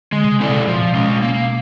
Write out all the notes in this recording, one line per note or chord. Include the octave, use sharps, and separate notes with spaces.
D3 G#3
C3
C#3
C4 E4 A4 D5
B2
B2 F3
A#2
B2
G#3 C#4
A#3